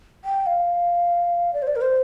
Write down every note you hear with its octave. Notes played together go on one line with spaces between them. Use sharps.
G5
F5
D5
C5
D5
A#4
C5